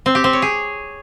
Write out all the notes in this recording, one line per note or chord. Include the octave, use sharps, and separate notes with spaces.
C4
G4
C4
C#5
G#4